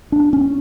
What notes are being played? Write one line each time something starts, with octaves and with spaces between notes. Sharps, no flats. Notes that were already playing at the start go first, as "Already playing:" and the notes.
D4
C#4